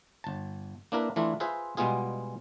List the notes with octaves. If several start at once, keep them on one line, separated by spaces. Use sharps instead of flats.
G1 A5
A#3 D4 E4 A#4 B4
E3 A3 D4 E4 F4
F4 G#4 B4 C5 E5
B2 G3 G#3 B3 F4 G#4